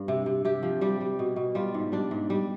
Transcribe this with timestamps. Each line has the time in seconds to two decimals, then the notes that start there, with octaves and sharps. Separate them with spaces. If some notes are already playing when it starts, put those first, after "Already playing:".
Already playing: G2
0.08 C3
0.26 C3
0.45 C3 G4
0.63 F3
0.81 G3 G4
1.00 G3
1.19 B2
1.36 B2
1.55 G3 F4
1.74 G#2
1.92 G3 D4
2.11 G#2
2.30 G3